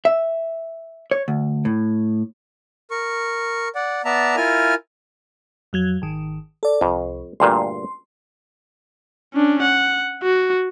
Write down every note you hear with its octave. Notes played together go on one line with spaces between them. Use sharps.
E5
C#5
D2
A2
A#4 C#6
D5 F#5
B3 D5 E5 A5 A#5
E4 F4 A#4 G#5 F6
F2 F#3 G#6
G#1 D#3
A4 D5
C2 F2
D2 G2 A#2 C6
C#4 D4
F#5
F#4